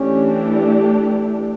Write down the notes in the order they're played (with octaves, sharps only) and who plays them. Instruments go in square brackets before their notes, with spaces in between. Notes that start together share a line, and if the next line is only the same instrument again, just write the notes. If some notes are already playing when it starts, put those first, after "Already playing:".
Already playing: [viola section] E3 A3 D4 G4 [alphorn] C#4